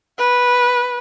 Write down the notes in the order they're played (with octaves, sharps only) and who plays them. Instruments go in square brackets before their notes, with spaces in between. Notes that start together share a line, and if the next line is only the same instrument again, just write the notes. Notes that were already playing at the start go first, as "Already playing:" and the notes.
[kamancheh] B4